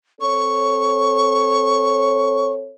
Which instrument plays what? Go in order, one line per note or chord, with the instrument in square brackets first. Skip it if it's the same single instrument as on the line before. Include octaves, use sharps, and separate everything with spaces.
[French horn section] C4 A4 C#5 [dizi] C#6